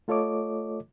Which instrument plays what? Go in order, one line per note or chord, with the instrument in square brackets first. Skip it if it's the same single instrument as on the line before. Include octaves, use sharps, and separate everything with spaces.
[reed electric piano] A3 F4 A4 C#5 D#5 D6